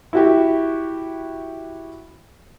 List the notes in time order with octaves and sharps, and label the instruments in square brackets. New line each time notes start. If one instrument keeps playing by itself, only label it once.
[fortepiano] E4 F#4 G4